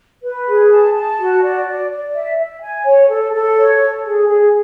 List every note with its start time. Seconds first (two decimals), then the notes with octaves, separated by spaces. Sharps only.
0.23 B4
0.47 G#4
0.71 A5
0.95 A5
1.19 F#4
1.43 D5
1.67 D5
1.90 D5
2.13 E5
2.38 E5
2.62 G#5
2.85 C#5
3.09 A4
3.33 A4
3.57 C#5
3.80 A4
4.04 G#4
4.27 G#4